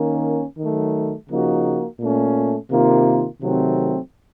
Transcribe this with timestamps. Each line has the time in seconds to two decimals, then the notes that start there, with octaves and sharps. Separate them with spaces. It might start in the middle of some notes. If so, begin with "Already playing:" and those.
Already playing: D#3 A#3 C#4
0.58 D#3 F#3 A3
1.30 C#3 F3 A#3 D#4 F#4
1.99 A#2 A3 C#4
2.70 C3 D#3 A#3 F4
3.40 C3 D#3 F#3 A3 C4